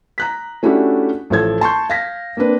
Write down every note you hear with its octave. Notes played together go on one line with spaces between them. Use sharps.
A#5 F#6 B6
A3 C#4 D4 E4 F#4 G4
A1 F3 A4 G#6
A5 C6 C#6 G6
F5 A#6 B6
A#3 C4 D4 B4